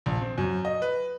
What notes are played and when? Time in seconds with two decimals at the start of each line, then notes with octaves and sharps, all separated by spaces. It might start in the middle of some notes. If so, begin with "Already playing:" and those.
0.06 A#1
0.22 C4
0.38 F#2
0.65 D#5
0.82 B4